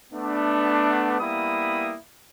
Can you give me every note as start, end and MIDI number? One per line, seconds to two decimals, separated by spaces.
0.13 1.16 57
0.13 1.16 59
0.13 1.16 62
1.19 1.94 55
1.19 1.94 58
1.19 1.94 59
1.19 1.94 64
1.19 1.94 83
1.19 1.94 87